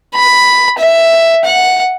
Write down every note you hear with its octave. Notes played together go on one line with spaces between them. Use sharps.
B5
E5
F#5